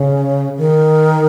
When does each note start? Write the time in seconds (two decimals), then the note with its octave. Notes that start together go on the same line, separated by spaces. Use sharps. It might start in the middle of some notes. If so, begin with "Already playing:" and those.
Already playing: C#3
0.58 D#3